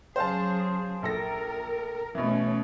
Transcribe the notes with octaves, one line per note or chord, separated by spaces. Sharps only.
C#3 F#3 G#4 C5 F5 A5
A#1 A4 A#4 A#6
B2 E3 A3 C#4